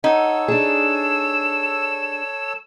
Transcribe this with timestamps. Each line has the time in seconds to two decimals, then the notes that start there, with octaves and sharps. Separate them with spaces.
0.04 D#4 A4 C#5 F#5 E6
0.48 D4 G#4 E7